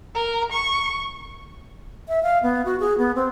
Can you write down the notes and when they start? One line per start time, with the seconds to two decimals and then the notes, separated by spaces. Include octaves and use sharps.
0.15 A#4
0.52 C#6
2.08 E5
2.23 F5
2.43 B3
2.65 F#4
2.80 G#4
2.98 B3
3.16 C4